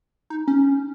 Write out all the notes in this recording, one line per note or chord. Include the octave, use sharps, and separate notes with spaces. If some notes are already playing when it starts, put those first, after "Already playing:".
D#4
C#4